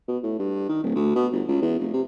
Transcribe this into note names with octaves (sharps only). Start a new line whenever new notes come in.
B2
A2
G2
D#3
D1
D2
B2
G1
C#2
E2
F1
C3